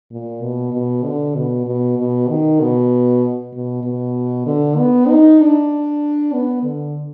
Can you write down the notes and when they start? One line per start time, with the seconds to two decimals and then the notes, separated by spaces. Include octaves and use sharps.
0.12 A#2
0.43 B2
0.73 B2
1.05 D3
1.36 B2
1.67 B2
1.98 B2
2.29 D#3
2.60 B2
3.53 B2
3.84 B2
4.46 D3
4.78 B3
5.09 D#4
5.40 D4
6.33 B3
6.63 D3